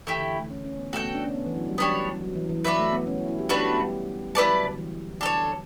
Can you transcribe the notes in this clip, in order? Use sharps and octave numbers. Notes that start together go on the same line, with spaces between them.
E3 A3 E4 G4
D3
E3
A3
C#4
C#4
B3
A3 F#4 A4 E5 G5
B3
D4
C#4
B3
E3
F#3
G3
F#3 B3 D4 G4 C#5
F#3
E3
E3
F#3 D4 F#4 B4 E5
A3
B3
C#4
E4
E4
G4
A3 D4 F#4 G4 B4
G4
B3
G3
G3 E4 B4 D5 A5
F#3
D3
E3
D4 A4 C#5